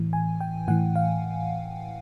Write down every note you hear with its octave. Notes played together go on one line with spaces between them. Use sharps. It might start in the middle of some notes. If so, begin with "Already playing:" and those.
Already playing: A2 E3
G#5
G5
A2 E3 F#5
F5